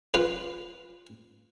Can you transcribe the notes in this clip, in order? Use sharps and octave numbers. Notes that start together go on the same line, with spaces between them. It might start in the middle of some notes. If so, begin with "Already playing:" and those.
F4 B4